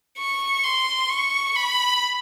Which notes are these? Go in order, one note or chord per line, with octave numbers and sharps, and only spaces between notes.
C#6
C6
C#6
B5